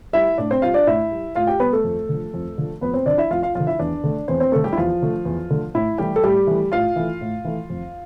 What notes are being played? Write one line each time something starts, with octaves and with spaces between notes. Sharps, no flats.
G3 E4 E5
A2 D4 D5
C4 C5
G3 F4 F5
D4 D5
A2 E4 E5
G3
A2 F4 F5
G4 G5
G3 B3 B4
A3 A4
F2
D3 F3
F2
D3 F3
F2 B3 B4
C4 C5
D3 F3 D4 D5
E4 E5
F2 F4 F5
F4 F5
D3 F3 F4 F5
E4 E5
E2 D4 D5
D3 A3
E2 C4 C5
C4 C5
D3 A3 A4
G3 G4
E4
E2 F3 F4
D3 A3
E2
D3 A3
A2 E4
E3 G3 A3 G4
A4
A2 G3 G4
E3 A3
A2 F4 F5
E3 A3
A2
E3 A3
F2